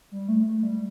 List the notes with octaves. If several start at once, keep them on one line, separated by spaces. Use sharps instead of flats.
G3
A3
A3
G3